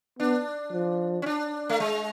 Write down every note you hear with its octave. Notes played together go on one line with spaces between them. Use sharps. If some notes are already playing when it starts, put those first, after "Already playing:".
B3 D4
F3
C#4
D4
A3
G#3